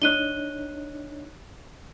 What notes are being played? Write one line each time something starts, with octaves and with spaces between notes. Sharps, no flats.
D4 D#4 C#5 F#6 D#7 G7